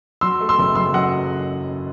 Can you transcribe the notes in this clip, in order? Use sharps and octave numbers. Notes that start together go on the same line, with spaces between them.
F#3 C6 E6
A3
C6 E6
F#1
F#2 C6 E6
F#3 D#5 F#5